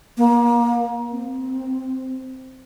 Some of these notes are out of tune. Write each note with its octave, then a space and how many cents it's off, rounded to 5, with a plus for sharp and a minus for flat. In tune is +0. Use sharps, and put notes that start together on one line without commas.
A#3 +30
C4 -5